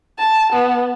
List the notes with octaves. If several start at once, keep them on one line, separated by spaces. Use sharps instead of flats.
A5
B3